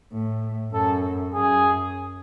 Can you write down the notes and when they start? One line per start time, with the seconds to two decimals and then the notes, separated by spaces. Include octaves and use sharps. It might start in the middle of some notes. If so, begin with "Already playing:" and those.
0.13 A2
0.73 F#2 A4
1.34 F#2 G#4